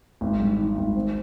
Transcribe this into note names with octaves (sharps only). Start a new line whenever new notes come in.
G#1
G2
D#3
G#1
C4